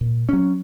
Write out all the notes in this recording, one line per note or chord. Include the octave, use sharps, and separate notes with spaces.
A#2
F#3 C#4